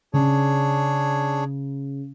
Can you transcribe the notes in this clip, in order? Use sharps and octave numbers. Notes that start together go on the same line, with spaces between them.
C#3 D4 G#4 C#5